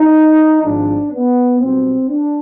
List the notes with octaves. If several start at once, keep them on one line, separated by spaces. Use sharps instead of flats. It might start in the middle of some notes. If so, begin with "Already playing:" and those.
Already playing: D#4
G#1 G#2 F3 G#3 D4
B3
B1 B2 G3 C4
D4